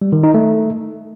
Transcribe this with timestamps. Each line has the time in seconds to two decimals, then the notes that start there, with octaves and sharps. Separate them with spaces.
0.02 G3
0.12 D#3
0.23 D#4
0.34 A3